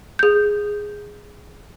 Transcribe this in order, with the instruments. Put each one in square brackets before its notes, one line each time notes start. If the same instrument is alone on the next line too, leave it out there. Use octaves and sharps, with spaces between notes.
[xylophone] G#4 G6